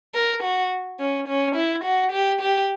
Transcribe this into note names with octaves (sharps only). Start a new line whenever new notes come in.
A#4
F#4
C#4
C#4
E4
F#4
G4
G4